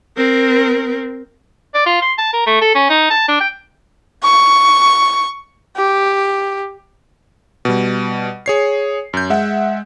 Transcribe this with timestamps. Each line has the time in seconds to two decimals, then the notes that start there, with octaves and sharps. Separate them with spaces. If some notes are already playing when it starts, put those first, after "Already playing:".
0.17 C4 A#4
1.74 D5
1.86 F4
2.02 C6
2.18 A5
2.33 A#4
2.46 A3
2.61 A4
2.75 C#4
2.90 D#4
3.11 A5
3.28 D4
3.41 G5
4.24 C#6
5.77 G4
7.65 B2 G3
8.46 G#4 C#5 C7
9.13 F#2 G6
9.30 G#3 E5 F#5